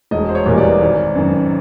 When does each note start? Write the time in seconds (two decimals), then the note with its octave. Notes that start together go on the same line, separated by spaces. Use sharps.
0.11 E1 D#5
0.29 C5
0.35 C#5
0.46 E2 B2 G3 A#3
0.58 D5
0.81 G#1
1.15 F#2 D#3